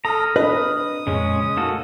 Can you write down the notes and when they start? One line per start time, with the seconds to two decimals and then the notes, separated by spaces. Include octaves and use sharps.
0.05 A4 A#5 D#6 F6
0.36 C4 D4 B4 D#5 D#6
1.07 F2 A#2 C#3 G#3 C#4
1.57 A#3 D#4 F#4 A4